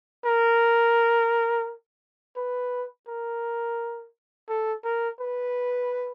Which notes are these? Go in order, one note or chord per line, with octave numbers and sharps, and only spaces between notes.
A#4
B4
A#4
A4
A#4
B4